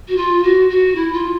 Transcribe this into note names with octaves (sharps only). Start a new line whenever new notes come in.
F#4
F4
F#4
F#4
E4
F4